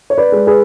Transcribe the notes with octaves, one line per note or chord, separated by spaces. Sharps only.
C#5
B4 D5
G#3
G#4 B4